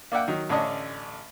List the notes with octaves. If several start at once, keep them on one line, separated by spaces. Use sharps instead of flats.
A#3 D5 E5 F#5 G5
D#3 F#3
A1 D3 C#4 D4 D#5